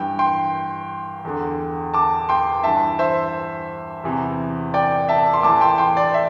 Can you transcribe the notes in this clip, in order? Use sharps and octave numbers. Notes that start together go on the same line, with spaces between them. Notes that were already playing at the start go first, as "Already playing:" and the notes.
Already playing: G2 E3 G5
G5 C6
E2 D3
A5 D6
G5 C6
G2 E3 E5 A5
C5 E5
E2 C3 E3
D5 G5
E5 A5
C6
A2 E3 A5 D6
G5 C6
G5 C6
D5
E5